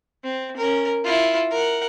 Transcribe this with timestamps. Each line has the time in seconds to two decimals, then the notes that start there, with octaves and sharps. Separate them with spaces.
0.24 C4
0.57 C#4 A#4
1.04 E4 F4
1.50 A#4 F#5